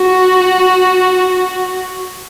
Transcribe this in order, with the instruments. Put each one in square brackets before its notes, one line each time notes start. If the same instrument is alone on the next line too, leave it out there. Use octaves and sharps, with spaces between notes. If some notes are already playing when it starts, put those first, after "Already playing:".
Already playing: [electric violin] F#4